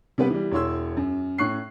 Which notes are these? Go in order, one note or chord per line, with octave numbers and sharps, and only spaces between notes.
C3 G3 B3 B4
E3 G3
E1 E4 C#5 C6 E6
F#2
A2 C#4 C#6 F#6 C7